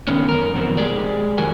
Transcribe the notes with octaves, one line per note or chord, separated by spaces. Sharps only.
D3 D#3 B3 C#4
F#2 A#4
F2 B2 D#3 C4
G#3 G4 G#4 D5
F2 D#3 F#3 F#4 A#4 G#5